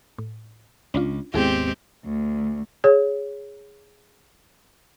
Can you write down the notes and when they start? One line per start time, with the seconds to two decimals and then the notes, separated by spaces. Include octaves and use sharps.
0.18 A2
0.94 C#2 C#4 D4 F4
1.34 G#1 D#2 G#3 B3 C4 E4 G4 G#4
2.05 D2
2.84 G#4 C#5